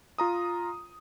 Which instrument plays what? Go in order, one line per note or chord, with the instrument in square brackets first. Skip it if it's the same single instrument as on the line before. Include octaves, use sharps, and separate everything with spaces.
[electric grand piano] F4 A#5 D#6